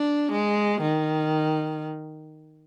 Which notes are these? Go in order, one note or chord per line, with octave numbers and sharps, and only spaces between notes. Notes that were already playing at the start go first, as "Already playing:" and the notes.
Already playing: D4
G#3
D#3